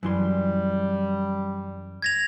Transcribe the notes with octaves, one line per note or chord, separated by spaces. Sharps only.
F#2 E3 G3 C6
G#6 A#6 F7